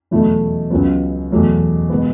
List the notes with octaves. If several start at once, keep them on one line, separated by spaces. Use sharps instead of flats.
E2 B2 F#3 A3 E4
C#2 C#3 F#3 B3
E2 B2 F#3 A3
B2 G#3 B3